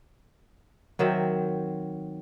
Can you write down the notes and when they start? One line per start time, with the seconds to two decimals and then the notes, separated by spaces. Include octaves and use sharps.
0.99 D#3 F#3 C4 E5